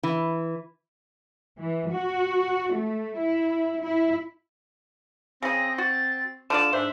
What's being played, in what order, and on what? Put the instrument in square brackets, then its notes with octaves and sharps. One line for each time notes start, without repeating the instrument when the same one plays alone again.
[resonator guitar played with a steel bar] E3
[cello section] E3
F#4
A3
E4
E4
[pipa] C#3 G#4 [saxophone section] C4 [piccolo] A#6
[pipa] F#4 [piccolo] A6
[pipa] D3 F4 D5 [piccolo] E7
[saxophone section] G#2 D4 [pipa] C5 [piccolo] E5